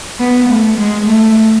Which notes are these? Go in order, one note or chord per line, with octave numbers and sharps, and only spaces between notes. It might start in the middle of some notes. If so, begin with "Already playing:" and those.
B3
A3
G#3
A3